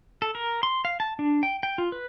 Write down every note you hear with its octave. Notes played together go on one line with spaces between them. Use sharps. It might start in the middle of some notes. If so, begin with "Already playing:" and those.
A4
A#4
C6
F5
A5
D4
G5
G5
F4
B4